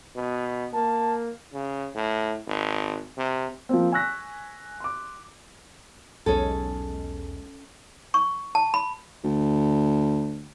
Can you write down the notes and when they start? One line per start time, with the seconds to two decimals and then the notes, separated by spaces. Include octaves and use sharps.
0.16 B2
0.73 A#3 A5
1.54 C#3
1.95 A2
2.46 G#1
3.17 C3
3.69 F3 A#3 C4
3.92 G#5 C#6 E6 F#6 A#6 B6
4.80 C6 D6
6.26 B1 E2 G#3 C#4 G#4 A4
8.14 C#6
8.55 A5
8.74 B5
9.24 D2